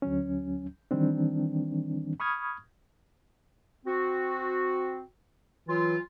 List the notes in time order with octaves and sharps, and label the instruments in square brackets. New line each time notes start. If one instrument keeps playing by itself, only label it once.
[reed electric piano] D2 F#3 C#4
D#3 E3 G3 C4 D4
B5 C#6 D#6 F6 G#6
[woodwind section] C4 F#4
E3 F#3 F4